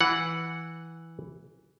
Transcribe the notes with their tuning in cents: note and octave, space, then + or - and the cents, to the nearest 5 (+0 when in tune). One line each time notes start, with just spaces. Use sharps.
E3 +0 F#5 -5